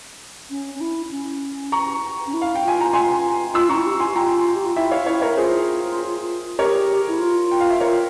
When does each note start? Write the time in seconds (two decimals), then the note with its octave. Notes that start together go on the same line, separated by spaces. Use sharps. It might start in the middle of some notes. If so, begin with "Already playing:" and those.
0.50 C#4
0.75 C#4
0.81 E4
1.11 C#4
1.72 A#5 C#6
2.27 C#4
2.34 E4
2.42 F5
2.55 G5
2.64 F4 G#5
2.81 A#5
2.93 G#5 C6
3.54 F4 C6 E6
3.69 C#4 A#5 C#6
3.75 E4
3.86 G4
3.96 F4 G#5 C6
4.07 G4
4.15 F4 G5 A#5
4.56 G4
4.66 F4
4.76 E4 E5 G5
4.91 C#5 F5
5.06 E4 C#5 F5
5.22 A#4 C#5
5.37 F4 G#4 C5
6.58 G4 A#4 C#5
7.08 E4
7.19 F4
7.51 G5
7.60 F5
7.70 E5
7.80 A#4 C#5